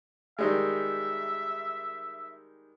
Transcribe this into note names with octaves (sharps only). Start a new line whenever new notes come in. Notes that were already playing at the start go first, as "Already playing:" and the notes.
D#3 G3 G#3 E5